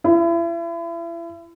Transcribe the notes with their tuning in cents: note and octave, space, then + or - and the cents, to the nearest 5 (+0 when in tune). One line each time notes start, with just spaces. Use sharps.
E4 +35